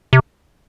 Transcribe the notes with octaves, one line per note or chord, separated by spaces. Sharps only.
C3